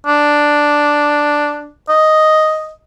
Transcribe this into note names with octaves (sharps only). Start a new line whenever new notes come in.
D4
D#5